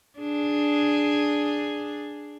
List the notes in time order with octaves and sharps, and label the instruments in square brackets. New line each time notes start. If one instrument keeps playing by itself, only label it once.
[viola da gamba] D4 G#4